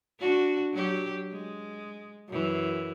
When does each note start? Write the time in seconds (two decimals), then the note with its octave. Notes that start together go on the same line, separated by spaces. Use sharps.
0.20 D4 F#4
0.72 F#3 G4
1.32 G#3
2.29 F#2 E3